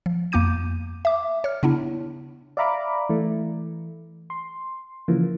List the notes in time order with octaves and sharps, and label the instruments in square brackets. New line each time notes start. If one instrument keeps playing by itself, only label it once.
[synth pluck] F3
F2 A#3 B3 D6 G6 D#7
E5 D6
C#5 F6
C#3 B3 D4 E4
[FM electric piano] D5 E5 F5 A#5 B5 D6
E3 A3
C6
C#3 E3 F3 A#3